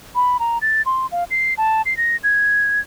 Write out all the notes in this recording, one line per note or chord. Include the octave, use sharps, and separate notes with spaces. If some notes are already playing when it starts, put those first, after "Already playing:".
B5
A#5
A6
C6
F5
C7
A5
C7
A#6
G#6